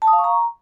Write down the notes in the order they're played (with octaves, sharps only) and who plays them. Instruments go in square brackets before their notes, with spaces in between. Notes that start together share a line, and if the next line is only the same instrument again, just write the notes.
[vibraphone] A5
D#6
F5
C#6
A#5